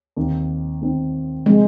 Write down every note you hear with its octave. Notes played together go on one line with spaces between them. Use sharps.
D#2 D#3 C4
D#2 D#3 C4
C3 F3 G#3